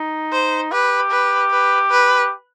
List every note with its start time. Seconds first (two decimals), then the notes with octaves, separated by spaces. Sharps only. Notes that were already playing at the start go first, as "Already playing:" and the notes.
Already playing: D#4
0.32 C5
0.71 G4 B4
1.11 B4
1.51 B4
1.90 B4